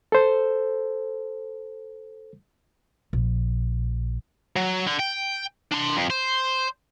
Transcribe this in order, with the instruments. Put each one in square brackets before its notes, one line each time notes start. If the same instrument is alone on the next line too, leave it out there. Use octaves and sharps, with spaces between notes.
[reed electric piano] A4 C5
[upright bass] A#1
[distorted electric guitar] F#3
D3
G5
D4 C6
F2
C5